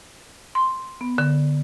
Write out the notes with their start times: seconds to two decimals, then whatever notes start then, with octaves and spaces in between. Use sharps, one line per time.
0.55 C6
1.01 B3
1.18 D3